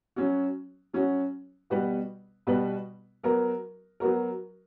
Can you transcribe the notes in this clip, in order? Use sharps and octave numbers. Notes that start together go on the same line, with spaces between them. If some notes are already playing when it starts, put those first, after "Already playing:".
F#3 C#4 F#4
F#3 C#4 F#4
B2 G3 B3 F#4 B4
B2 G3 B3 F#4 B4
F#3 B3 F#4 A#4
F#3 B3 F#4 A#4